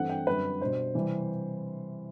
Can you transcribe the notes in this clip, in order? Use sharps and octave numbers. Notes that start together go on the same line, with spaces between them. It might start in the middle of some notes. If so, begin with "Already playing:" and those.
Already playing: G2 E3 A3 C4 E4 F#5
G5
F#2 D3 G3 C4 B4
B2 G3 D4 C5
C3 E3 G3